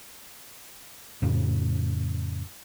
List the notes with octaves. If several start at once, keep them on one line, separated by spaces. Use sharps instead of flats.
F2 A2 C#3